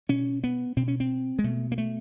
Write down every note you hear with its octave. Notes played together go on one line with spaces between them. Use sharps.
B2 C#4
B3
B2 C4
C#4
C4
G#3
B2 A3
A#3
A3